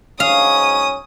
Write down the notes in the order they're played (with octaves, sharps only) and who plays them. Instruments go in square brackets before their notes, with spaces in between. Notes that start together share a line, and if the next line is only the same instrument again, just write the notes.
[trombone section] G#2 F#3 C#4 [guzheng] F5 [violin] D#6